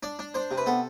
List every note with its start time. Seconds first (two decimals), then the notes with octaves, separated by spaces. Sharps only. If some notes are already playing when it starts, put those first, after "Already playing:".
0.03 D4 D5
0.19 D4
0.34 D4 C5
0.51 C3
0.58 B4
0.66 B3 A4